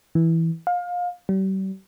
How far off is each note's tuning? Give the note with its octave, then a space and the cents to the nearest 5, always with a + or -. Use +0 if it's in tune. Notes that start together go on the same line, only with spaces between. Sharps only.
E3 -5
F5 +25
G3 -40